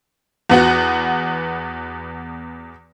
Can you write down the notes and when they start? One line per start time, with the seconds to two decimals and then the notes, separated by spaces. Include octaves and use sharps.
0.49 E2 B3 F#4